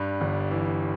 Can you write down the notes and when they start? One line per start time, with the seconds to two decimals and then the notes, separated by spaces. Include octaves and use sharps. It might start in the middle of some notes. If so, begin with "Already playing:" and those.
Already playing: G2 G3
0.21 G1
0.51 E3